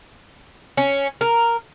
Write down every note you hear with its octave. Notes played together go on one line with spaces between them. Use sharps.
C#4
A#4